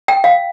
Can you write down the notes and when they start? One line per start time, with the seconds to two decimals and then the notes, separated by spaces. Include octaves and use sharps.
0.08 G5
0.24 F5